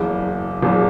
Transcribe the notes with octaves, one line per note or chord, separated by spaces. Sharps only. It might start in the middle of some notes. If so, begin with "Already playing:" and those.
Already playing: F#1 E2 C#3
F#1 E2 C#3